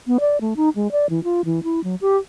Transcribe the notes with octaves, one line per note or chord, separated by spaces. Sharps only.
B3
D5
A3
D#4
G#3
D5
E3
F4
E3
E4
F#3
G4